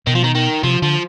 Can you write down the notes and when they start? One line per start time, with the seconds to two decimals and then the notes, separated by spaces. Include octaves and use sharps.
0.07 B2 D#3
0.15 F3
0.24 D#3
0.35 D#3
0.63 C3 F3
0.82 D3 F3